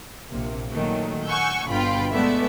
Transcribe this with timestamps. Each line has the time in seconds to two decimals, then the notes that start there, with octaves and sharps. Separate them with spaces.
0.31 A#1 C3 A#3
0.71 A#2 D#3 F#3 A3
1.26 F#5 G#5 C#6 E6 G6
1.68 G1 B2 D3 F4 G5 B5
2.12 G#3 A3 B3 D5 E5